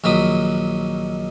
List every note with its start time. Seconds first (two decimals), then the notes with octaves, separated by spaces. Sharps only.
0.04 A#1 D#3 F#3 B5 D#6